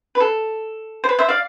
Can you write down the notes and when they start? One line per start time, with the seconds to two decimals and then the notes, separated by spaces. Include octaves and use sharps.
0.15 B4
0.20 A4
1.04 C5
1.09 B4
1.19 C5 E5
1.28 D5 F5